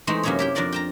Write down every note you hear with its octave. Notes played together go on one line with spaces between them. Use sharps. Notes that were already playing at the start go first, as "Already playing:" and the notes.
E3 G#3 A3 C4 D#4 C5
F#2 C3 A#3 C#4 D#4 C#5
E4 G4 G5
F2 D4 A#4 D5 C6
G5 A5 A#5